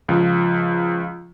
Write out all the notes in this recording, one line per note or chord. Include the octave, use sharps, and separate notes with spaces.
C#2 F3